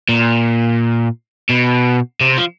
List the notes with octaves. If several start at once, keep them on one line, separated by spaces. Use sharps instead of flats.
A#2
B2
C3
F3